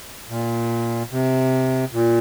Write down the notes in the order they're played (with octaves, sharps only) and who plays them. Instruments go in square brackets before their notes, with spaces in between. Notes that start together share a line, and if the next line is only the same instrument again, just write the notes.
[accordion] A#2
C3
A#2